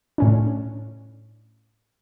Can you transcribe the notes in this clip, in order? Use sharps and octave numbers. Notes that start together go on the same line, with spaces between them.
A2 C#4 D4